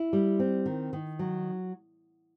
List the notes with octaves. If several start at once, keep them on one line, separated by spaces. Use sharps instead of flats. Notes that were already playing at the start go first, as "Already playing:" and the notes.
Already playing: E4
G3
C4
D#3
D#3
F#3